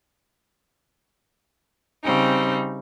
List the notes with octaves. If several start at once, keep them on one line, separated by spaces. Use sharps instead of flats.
C#3 G3 C4 D#4